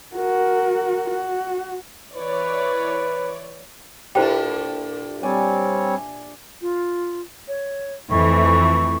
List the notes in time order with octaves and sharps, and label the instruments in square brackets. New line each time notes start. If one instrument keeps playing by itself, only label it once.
[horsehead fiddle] F#4 A#4
F#4
[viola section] E3 C#5 D5 [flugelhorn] B4
[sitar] A#2 D4 [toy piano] E4 C5 G5 [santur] G4 A4 E5
[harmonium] G3 C4 C#5 [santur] D5 G#5
[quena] F4
C#5
[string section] F2 E3 A3 [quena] C#6